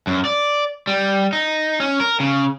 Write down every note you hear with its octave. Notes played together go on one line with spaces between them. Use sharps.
F#2
D5
G3
D#4
C#4
A#4
C#3